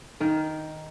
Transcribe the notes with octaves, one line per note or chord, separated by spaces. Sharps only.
D#3 A#4